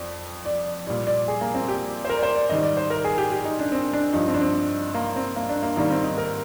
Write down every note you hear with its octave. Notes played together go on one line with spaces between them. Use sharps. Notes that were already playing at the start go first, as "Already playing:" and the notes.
Already playing: F2 D5
D5
A#2 G3 D5
D5
G#4
A#3
C4
G4
C5
A#4
D5
C5
D5
G#2 D#3 G3 D#5
D5
C5
A#4
G#4
G4
G4
D#4
D4
C4
D4
G2 F3 D#4
C4
D4
C4
A#3
C4
A#3
D4
A#3
G#2 D#3 G3 A#3
C4
D#4
A#4